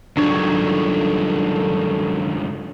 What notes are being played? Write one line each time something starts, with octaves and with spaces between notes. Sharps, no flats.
C#2 G2 D#3 F#3 D4 A4 C#5